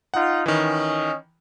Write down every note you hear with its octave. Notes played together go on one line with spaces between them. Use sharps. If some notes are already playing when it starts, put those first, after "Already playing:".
D#4 F4 F#5
D#3 E3 C#4 D#5